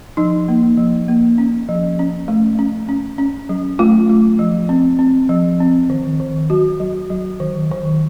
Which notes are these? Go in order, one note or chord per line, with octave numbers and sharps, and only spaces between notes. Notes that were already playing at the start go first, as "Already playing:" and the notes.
F3 D#4
A#3
F3
A#3
C#4
F3
C#4
A3
C#4
C#4
C#4
F#3
A3 F4
A3
F3
C4
C4
F3
C4
D#3
D#3
F#3 F#4
F#3
F#3
D#3
D#3